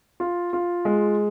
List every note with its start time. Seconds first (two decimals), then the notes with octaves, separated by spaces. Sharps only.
0.20 F4
0.53 F4
0.85 G#3